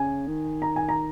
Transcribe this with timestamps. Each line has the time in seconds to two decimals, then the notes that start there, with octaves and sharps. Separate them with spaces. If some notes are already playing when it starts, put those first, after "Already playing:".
Already playing: C#3 G#5
0.27 D#3
0.62 A#5
0.76 G#5
0.89 A#5